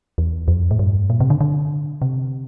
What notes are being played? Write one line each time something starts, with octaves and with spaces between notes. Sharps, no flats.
E2
F2
A2
G2
A#2
C3
D3
D3
C3